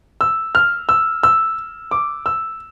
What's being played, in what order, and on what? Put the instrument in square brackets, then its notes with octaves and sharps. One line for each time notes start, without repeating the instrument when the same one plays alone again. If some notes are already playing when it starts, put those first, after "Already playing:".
[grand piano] E6
F6
E6
E6
D6
E6